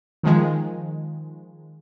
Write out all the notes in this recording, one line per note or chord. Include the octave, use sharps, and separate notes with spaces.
D#3 F3 G#3